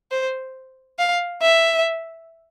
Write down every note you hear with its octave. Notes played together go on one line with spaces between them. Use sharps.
C5
F5
E5